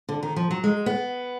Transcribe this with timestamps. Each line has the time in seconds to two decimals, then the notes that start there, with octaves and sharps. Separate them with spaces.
0.09 D3
0.23 D#3
0.36 F3
0.51 F#3
0.64 G#3
0.86 B3